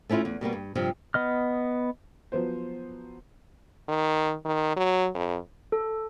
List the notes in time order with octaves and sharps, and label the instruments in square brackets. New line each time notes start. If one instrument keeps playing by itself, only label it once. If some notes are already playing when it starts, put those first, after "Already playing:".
[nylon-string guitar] A3 C#4 D4 E4 F4
E2
B2 G3 A#3 B3
G2
G2 C3 F3
[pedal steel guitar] B3 D#5 F6
[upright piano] F3 F#3 B3 C5
[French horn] D#3
D#3
F#3
F2
[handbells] A4